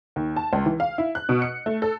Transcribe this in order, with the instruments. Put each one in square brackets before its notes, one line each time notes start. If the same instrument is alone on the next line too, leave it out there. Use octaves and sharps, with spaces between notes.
[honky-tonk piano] D#2
A5
C#2
E3
F5
E4
F#6
B2
C#7
A3
A4